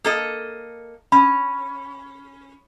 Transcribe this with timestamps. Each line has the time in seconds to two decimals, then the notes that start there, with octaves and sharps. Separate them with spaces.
0.04 A#3 A4 D#5
1.12 C#4 B5